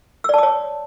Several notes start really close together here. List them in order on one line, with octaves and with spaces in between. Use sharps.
E6 D5 A5 D#6 C#5